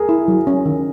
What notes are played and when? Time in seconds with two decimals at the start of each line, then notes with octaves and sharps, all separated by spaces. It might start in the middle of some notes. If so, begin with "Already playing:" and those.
Already playing: G#4 A#4
0.09 E4
0.28 F#3
0.47 C#4
0.66 D#3